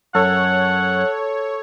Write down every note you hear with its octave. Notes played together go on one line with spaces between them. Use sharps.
F#2 A4 C#5 F#5